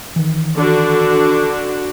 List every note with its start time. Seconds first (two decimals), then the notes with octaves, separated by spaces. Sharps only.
0.16 D#3 E3
0.55 D3 D4 F#4